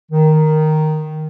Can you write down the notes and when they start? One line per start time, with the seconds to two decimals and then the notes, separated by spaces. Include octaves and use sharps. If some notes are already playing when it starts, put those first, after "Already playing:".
0.11 D#3